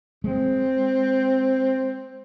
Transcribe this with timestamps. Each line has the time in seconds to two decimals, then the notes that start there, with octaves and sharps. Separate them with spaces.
0.24 G#3 C4